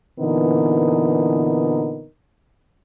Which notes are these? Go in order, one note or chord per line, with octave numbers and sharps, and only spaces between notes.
A#2 D3 E3 B3 D#4 A#4